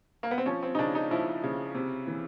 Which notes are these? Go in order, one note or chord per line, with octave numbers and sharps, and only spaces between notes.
A#3
B3
C4
F3 C#4
C4
D#4
C#3 D4
D#4
F3 E4
C#3
C3
E3